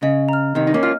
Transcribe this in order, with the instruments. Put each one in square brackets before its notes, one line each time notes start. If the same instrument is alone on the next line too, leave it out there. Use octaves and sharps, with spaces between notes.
[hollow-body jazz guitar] C#3 [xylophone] D#5
[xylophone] A#5 F6
[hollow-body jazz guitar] C3 D#3 [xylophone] D#5
[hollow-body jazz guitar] D#4
A#3 C#4
[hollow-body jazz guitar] F4 [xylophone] F6